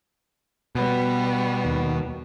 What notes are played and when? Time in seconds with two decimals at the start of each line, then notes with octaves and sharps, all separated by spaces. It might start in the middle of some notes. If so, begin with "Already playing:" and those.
0.75 B2 G3 B3
1.65 D#2